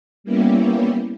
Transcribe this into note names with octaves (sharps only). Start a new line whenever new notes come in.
G3 A#3 B3 C#4 E4 G4